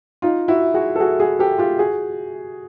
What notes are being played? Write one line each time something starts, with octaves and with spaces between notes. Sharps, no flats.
D#4 F4
E4 F#4
F#4 G#4
A4
F#4 G#4
F#4 G#4
G4 A4
F4 G4
F#4 G#4